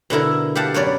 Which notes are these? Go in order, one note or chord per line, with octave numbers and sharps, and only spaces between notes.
B2 D3 E4 A#4
G4 F5 F#5 A5
F#2 B3 C#5 D5